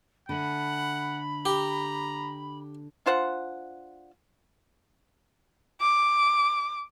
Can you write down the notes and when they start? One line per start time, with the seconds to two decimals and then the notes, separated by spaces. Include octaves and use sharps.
0.29 D3 A3 F#5 B5
1.45 G4 A#5
3.06 D4 F4 C5 F#5
5.81 D6